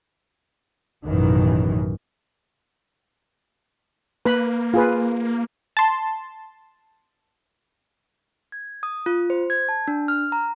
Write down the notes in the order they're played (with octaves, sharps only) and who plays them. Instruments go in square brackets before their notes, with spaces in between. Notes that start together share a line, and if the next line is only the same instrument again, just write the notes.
[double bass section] A1 F#2 B2 D#3 E3
[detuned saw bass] A#3 [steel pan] B4 B5
[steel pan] F4 G#4 B4
[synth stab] A5 C6
[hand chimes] G#6
D#6
F4
C5
G#6
A5
D4
F6
A#5